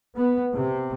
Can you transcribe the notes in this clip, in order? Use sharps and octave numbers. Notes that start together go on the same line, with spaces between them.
B3
C3